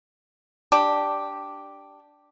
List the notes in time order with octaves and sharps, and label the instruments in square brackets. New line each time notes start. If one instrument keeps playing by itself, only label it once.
[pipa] D4 G4